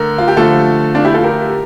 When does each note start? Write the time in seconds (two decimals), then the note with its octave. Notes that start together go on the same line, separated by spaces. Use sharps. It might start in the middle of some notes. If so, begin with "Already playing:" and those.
Already playing: D3 A3 A#4
0.18 F4
0.28 G4
0.36 D3 F3 A3 F4 A4
0.95 D4 F4
1.04 E4 G4
1.14 F4 A4
1.24 G4 A#4